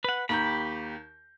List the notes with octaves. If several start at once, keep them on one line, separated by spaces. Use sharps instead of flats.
B4 F#5
D#2 G4 A#5 B5 G6